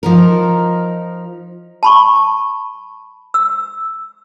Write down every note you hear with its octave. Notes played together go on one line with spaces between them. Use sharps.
F3 D#4 A#4
A5 B5 C#6
E6